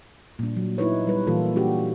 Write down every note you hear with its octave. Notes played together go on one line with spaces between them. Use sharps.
A#2 G3 D4
F#3
D#4 E4 B4 C#5
G3 B4
A#2 E3 A#3 F4 A4
D4 F#4 G4